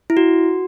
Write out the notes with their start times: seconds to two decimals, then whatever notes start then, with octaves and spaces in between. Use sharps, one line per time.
0.10 E4
0.17 F#4